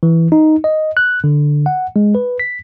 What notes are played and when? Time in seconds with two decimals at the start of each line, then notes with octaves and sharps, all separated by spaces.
0.03 E3
0.32 D#4
0.64 D#5
0.97 F#6
1.24 D3
1.66 F#5
1.96 G#3
2.15 B4
2.40 B6